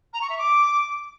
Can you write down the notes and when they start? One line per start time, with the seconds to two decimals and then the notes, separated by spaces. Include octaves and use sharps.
0.13 A#5
0.22 C#6
0.30 E5
0.38 D6